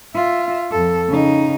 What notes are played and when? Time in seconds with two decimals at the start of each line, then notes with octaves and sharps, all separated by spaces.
0.14 F4 E5
0.71 F2 A4
1.08 C#3 D#4